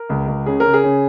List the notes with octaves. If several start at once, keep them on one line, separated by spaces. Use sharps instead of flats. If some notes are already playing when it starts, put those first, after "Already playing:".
Already playing: A#4
C#2
C#2
C#3 G#4
C#3 A#4
G#4
C#3